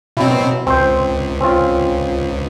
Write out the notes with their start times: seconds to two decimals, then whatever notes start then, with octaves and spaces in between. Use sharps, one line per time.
0.17 B2 F#3 C4 E4
0.67 C#2 C4 C5
1.40 C4 C#4 F4